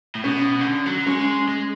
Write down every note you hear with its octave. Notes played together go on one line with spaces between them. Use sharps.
A2
B2 C#4
C#3
D3
F#3
G#3 C#4
G#3